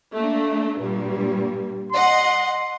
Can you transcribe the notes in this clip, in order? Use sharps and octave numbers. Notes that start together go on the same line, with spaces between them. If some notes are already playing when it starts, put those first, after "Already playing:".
A3 A#3 D4
G2 A#2 G3
D#5 F#5 C6